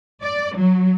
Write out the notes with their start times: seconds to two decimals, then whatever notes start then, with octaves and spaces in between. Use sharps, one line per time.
0.22 D5
0.57 F#3